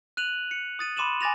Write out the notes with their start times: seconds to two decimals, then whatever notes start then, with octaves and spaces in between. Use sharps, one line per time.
0.17 F#6 D#7 F7 F#7
0.51 C#7
0.79 D#6 A6 D#7
0.97 B5 C6 D6 D#7 E7 F#7
1.21 G#5 D6 A6 A#6 F7